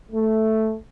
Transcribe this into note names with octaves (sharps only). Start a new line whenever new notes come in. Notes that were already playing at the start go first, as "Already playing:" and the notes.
A3